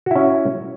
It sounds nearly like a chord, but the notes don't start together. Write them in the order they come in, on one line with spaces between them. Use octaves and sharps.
F#4 E4 C#4